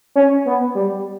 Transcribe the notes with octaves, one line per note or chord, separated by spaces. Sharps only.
C#4
B3
G3